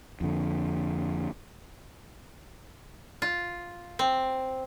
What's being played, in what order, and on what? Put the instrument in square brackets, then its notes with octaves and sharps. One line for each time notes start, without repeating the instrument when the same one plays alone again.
[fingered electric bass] F2 D3
[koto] F4
C4